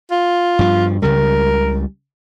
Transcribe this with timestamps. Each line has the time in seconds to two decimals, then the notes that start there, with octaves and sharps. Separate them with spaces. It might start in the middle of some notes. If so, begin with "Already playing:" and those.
0.11 F4
0.59 G2 F3
1.02 C#2 C#3 G3 A#4